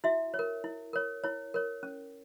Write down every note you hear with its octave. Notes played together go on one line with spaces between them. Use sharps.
E4 F#4 E5
C#5
A#4
E4
A#4 C#5
E4 C#5
A#4 C#5
C#4